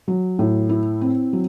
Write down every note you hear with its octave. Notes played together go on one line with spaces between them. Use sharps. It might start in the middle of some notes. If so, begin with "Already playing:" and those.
F#3
A2
E4
C4
F#3